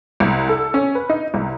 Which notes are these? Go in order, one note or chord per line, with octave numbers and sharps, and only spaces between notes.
C2
A4
C#4
B4
D#4
C2